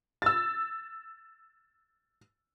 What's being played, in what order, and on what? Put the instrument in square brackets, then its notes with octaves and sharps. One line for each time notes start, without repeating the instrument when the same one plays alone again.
[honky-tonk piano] E6 A6